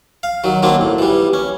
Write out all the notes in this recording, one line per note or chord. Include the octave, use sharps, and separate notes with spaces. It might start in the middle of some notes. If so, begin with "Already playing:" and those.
F5
D#3 F#3
D#3 F#3 A#3 C4 D4
A2
E3 G3
C#4